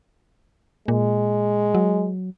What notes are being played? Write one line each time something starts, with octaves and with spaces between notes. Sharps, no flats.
A#2 G#3
F#3